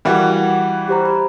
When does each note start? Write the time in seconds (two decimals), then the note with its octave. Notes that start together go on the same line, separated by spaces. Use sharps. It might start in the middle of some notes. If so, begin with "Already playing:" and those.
0.05 E3 G3 F#4 G#4 A#4 F5
0.32 F#5
0.88 G4 C5 A#5
1.05 B5